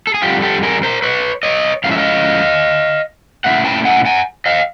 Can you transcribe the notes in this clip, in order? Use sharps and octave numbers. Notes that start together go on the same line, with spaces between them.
A4
G#4
F2 D3 G3 F4 G4
G4 A4
G#4 A#4
A#4 C5
B4 C#5
C#5 D#5
A2 F3 G#3 C#4 F5
E5
D#5 F5
A#2 F#3 A3 C#4 E4 E5 F#5
G5 A5
F#5 G#5
F#5 G#5
D#5 F5